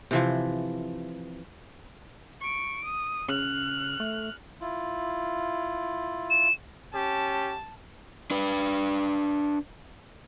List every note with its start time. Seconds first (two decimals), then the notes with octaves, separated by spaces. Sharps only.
0.11 C3 E3 F3
2.41 C#6 D7
2.84 D#6
3.28 C#3 F6 F#6
4.00 A3
4.61 E4 F4
6.30 E7
6.94 C#4 G4 A5
8.31 D4 B4